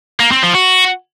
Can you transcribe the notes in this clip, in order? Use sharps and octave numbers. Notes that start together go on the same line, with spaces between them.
A#3
C4
F3
F#4